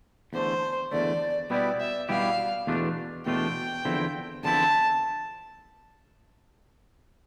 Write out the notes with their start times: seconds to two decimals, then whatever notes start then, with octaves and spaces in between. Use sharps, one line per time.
0.33 E2 D3 A3 C5
0.92 E2 D3 A3 D5
1.50 B2 G3 B3 E4 G4 D5
1.80 E5
2.09 B2 G3 B3 E4 G4 F5
2.67 E2 B2 A3 D4 F4
3.26 E2 B2 A3 D4 F4 G5
3.85 E2 D3 F3 C4 E4
4.43 E2 D3 F3 C4 E4 A5